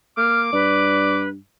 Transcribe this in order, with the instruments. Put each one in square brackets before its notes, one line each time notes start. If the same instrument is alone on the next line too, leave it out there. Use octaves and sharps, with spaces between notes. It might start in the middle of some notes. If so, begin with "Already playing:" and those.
[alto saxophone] A#3 [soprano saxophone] D6 [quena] F6
[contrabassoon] G2 [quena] B4 [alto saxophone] D5